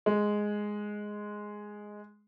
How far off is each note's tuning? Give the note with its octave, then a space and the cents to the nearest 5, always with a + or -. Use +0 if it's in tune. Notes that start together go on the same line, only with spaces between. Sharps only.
G#3 +0